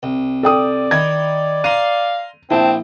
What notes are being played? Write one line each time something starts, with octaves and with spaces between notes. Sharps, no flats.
C2
A4 D5 G5 D#6
D#3 E4 G#6
F5 A#5 C6 D#7
A#1 C4 E4 G5 A5